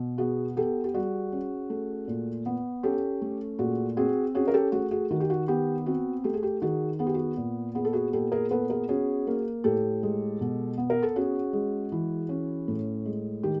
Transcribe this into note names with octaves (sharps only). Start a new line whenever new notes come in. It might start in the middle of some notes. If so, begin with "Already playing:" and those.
Already playing: B2
B3 F#4 G#4
B3 G4 A4
G4
G3 F#4 G#4
C#4
A3
A#2
B3
C#4 G4 A4
A3
A#2 F#4 G#4
C4 F#4 G#4
C#4 F#4 G#4
A#4
G4 A4
A3 F#4 G#4
F#4 G#4
D#3 F#4
G4
F#4
B3 G4
C4 F#4
A3 G4
G#4
G4
D#3 F#4 G#4
B3 G#4
G4
F#4 G#4
A#2
B3 G#4
A4
F#4 G#4
A#2 G4 A4
G#4 A#4
B3 A4 B4
G#4 A#4
C#4 F#4 G#4
A#3
A2 G4 A4
G#3
B2
B3
A#4
A4
C#4 F#4 G#4
G#3
E3
C#4
A2
G#3
D#3 G4